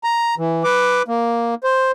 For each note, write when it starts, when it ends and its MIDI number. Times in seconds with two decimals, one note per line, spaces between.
0.04 0.35 82
0.38 0.63 52
0.64 1.02 71
0.64 1.02 86
1.08 1.55 58
1.64 1.92 72